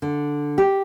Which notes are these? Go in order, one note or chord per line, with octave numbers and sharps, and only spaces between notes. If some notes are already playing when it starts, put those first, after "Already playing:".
D3
G4